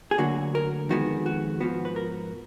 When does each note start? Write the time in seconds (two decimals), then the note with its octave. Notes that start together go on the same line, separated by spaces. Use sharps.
0.11 G#4
0.18 D2 D3 F#3 A#3 F#4
0.55 A#4
0.89 F2 D#3 G#3 B3 F#4
1.26 F#4
1.61 G#2 F3 B3 F#4
1.85 B4
1.96 A#4